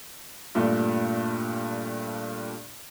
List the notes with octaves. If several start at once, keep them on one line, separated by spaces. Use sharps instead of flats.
G2 A#2 A3